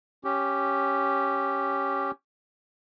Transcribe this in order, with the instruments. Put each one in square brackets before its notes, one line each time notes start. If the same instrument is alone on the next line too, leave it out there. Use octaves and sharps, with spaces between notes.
[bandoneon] C#4 G4